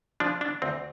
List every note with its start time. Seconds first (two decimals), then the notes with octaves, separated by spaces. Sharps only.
0.20 F3 D4
0.41 D4
0.62 D2 C4